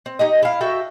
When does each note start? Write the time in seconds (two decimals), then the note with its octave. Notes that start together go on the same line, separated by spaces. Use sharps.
0.06 C4
0.19 D#4 G4 D#5
0.43 E4 F5
0.61 F#4 A4 E5 G5